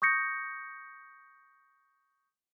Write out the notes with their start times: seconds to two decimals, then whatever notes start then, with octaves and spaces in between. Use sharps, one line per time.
0.02 C#6 D#6 G6 A#6 C#7